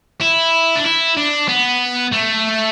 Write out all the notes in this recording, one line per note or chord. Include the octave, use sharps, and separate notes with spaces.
E4
D4
E4
D4
B3
A3